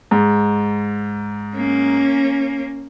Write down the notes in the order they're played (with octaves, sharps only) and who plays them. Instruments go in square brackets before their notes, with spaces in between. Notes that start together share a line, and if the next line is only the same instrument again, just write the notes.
[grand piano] G#2
[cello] A#3 C#4